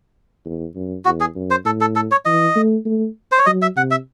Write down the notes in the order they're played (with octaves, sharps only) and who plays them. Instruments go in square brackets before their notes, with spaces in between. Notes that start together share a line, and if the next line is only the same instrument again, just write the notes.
[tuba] E2
F#2
[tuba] E2 [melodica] F#4
[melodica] G#4
[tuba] F#2
[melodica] C5
[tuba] A2 [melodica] A4
[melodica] A4
A4
C#5
[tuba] E3 [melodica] D#5
[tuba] A3
A3
[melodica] C5
C#5
[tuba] F#3 [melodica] D#5
[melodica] E5
[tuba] C3 [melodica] F#5
[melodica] E5